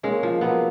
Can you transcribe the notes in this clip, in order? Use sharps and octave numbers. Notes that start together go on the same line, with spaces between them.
G#3 A#3 C#4
F3
F#3 A#3 B3